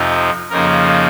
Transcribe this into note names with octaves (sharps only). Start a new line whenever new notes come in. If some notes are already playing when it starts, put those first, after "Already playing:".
Already playing: F2 C3 F3 C4 D#4
F2 C#3 F3 A#3 D#4 A#4